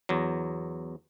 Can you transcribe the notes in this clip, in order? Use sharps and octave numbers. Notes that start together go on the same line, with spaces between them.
E2 F#3